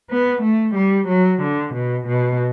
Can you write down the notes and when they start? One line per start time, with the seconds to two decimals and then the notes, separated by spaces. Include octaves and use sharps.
0.10 B3
0.42 A3
0.75 G3
1.08 F#3
1.42 D3
1.75 B2
2.08 B2